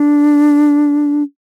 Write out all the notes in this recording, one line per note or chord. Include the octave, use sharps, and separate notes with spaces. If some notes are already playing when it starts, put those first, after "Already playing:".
Already playing: D4